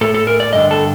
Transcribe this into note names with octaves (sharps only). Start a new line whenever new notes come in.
A2 A4
A4
A#4
D5
G2 D3 D#5
A4